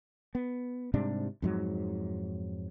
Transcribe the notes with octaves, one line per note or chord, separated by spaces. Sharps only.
B3
G#2 C3 G3 D4
F2 G#2 F#3